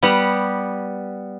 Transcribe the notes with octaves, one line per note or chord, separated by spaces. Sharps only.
G3 B3 G4 F#5